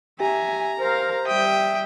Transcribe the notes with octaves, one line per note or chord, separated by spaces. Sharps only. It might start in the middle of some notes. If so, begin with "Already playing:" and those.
G4 E5 G#5 A#5
A#4 C5 F5
G3 E5 G5 D#6